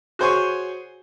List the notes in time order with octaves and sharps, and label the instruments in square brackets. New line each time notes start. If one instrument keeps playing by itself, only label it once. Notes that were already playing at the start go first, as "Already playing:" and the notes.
[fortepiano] F#4 G#4 C5 C#5 G#5 C#6